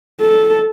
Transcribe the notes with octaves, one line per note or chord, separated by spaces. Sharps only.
A4